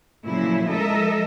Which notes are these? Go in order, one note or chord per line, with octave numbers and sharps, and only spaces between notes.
A#2 C#3 F3 F#3 A3 E4
F3 G#3 A4 A#4 D#5 E5